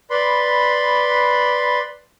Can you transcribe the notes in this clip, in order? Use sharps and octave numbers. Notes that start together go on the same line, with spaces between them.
B4 D5 B5 C6